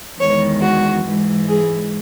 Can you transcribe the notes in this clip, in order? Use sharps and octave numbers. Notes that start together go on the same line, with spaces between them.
E2 D#3 G#3 C#5
F#4
G#2 E3 G#3
G#4